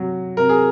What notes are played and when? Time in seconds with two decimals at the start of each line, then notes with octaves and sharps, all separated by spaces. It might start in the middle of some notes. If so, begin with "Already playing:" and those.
Already playing: C3 F#3
0.37 C3 A#4
0.49 G#4